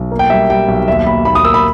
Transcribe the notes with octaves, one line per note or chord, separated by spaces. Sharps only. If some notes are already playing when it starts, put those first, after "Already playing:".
Already playing: B1
A#3
G5
G3 E5
G3 G5
B1
D#2 E5
D#2 B5
D#2 B5
D#6
A#3 E6
B5